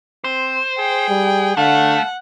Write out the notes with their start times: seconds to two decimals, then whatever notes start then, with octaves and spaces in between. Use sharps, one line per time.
0.24 C4 C5
0.79 G#4 G5
1.09 G3
1.57 D3 A3 F5 F#5